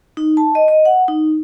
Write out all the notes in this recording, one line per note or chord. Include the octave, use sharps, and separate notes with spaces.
D#4
A5
D#5
D#5
F#5
D#4